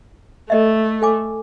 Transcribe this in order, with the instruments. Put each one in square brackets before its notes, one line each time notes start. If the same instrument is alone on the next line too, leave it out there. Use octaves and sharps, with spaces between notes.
[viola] A3 [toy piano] A4 D#5 E5
[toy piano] A4 G#5 D6